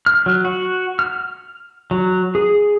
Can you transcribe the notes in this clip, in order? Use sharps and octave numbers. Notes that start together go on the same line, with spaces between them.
F6
F#3
F#4
F6
F#3
G#4